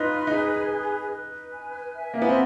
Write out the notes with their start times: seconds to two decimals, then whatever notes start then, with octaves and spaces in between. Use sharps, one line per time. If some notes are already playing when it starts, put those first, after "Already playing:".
Already playing: D#4 F4 B4
0.27 D#4 G#4
0.69 B4
1.11 B4
1.53 G#5
1.95 E5
2.14 A#3
2.22 B3
2.29 C4